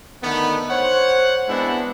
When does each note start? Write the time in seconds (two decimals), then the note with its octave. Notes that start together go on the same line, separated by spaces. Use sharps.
0.22 D3 D#3 A3 B3
0.70 C5 C#5 F#5
1.48 G#3 B3 C4 D4 E4 F#5